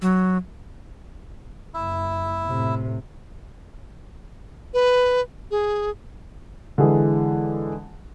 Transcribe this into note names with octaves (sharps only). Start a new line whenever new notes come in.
F#3
F#1 E4 E5
A2 C3
B4
G#4
D3 E3 G#3 G#4